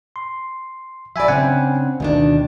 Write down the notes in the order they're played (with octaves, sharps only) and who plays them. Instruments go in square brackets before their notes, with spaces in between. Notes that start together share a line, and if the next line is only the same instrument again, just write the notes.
[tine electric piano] C6
[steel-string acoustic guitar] F#3 D5 [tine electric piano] E5 G#5 B5
[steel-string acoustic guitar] C#3 C4 D4 [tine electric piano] F#5 G#5
[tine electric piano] D2 [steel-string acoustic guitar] B2 D#3 D4